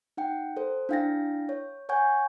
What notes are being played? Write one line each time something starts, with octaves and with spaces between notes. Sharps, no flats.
D#4 F#5 G5
A4 C5
D4 E4 F5 G5 A6 A#6
C#5
C#5 F#5 G#5 C#6 G6